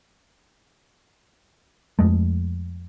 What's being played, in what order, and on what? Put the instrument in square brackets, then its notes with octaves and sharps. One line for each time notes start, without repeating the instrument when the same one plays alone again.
[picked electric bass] F2 G#3 A3